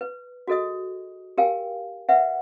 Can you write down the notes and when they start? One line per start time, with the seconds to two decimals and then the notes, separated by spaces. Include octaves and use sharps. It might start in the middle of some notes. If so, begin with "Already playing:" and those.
0.01 B4
0.48 F#4 G#4 A4 D#5 D#6
1.38 G4 A#4 F5 G5 G#5
2.09 B4 E5 F#5